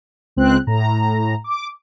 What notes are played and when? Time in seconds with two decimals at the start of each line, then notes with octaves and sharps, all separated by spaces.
0.36 C#2 C4 F#6
0.67 A2 A#5
1.44 D6